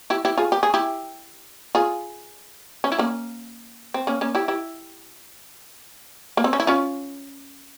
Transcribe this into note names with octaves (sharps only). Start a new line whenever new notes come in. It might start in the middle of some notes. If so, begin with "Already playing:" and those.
E4 G4
E4 G4
F4 G#4
G4
G#4
E4 G4
F4 G#4
C#4
E4
A#3 C#4
C4
A#3 C#4
A#3 C#4
E4 G4
E4 G4
A#3
C4
C#4
E4
C#4 F4